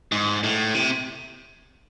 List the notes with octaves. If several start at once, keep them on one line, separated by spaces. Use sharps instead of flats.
G#2
A2
C3